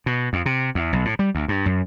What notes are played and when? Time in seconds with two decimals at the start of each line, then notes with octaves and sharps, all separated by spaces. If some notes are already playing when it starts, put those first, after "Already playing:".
0.06 B2
0.33 F2
0.46 C3
0.75 E2
0.93 B1
1.05 A2
1.19 G3
1.35 D2
1.48 G2
1.66 F#2